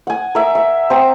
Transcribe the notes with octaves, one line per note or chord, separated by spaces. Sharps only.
F#5 G#5
A#4 E5
E5
C4 A#5 D#6